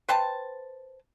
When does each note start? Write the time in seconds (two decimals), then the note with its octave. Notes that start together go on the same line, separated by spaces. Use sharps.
0.08 B4 C5 G5 A5